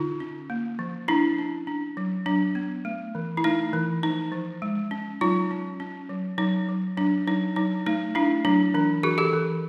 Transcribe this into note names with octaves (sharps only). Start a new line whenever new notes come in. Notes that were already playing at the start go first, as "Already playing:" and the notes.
Already playing: D3 D#4 F4
C#4
A#3
F3
F3 D4 E4
C#4
D4
F#3
F#3 D4
B3
A3
E3
E4
A3 D#4
E3
F3 D#4
F3
G#3
C#4
F#3 D#4 F4
C#4
C#4
F#3
F#3 D#4
F#3
F#3 D4
F#3 D#4
F#3 D#4
A3 D#4
A3 D4 E4
F#3 D4
E3 D4
E3 F#4 G#4
G4 A4
E3